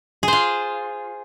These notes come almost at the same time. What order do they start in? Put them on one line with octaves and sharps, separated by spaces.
G#4 C5 F4